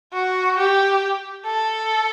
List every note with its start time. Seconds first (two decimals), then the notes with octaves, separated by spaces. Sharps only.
0.14 F#4
0.58 G4
1.46 A4